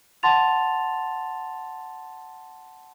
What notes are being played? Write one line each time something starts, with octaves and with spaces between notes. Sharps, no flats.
F#5 A5 C6 A6 F7